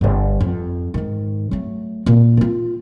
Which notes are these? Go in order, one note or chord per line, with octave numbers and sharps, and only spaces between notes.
G1 D3
F2
G#2 D#3
F#3 A3
A#2
D#3 F4